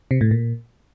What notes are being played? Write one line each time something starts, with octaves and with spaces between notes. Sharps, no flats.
C3
A2
A#2